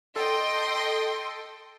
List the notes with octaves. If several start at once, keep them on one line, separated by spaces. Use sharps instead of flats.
A4 D#5 G5 C6